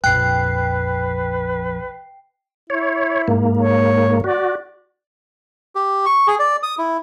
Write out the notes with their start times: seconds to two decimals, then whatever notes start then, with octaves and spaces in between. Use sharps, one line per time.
0.04 A#1 F2 B4 G5 F#6 C7
2.70 E4 C#5
3.28 G#2 A#3
3.59 C#5
4.24 F#4 D5
5.75 G4
6.06 C#6
6.27 G#4
6.39 D5
6.63 D#6
6.78 E4